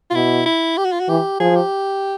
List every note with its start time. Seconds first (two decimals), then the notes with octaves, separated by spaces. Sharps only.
0.10 F4
0.14 B2 E4
0.46 E4
0.77 G4
0.85 F#4
0.92 F4
1.00 F#4
1.09 E3 G4
1.40 F3 G#4
1.56 G4